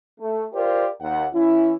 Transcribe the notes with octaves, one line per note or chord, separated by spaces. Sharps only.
A3
F4 G4 A#4 C5 D5
D#2 F#5
E3 C#4 E4